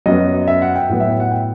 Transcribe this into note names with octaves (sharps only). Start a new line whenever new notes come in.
F#2 F#3 B3 D#5
E5
F#5
G5
A2 F#3 B3 F#5
E5
G5
F#5
G5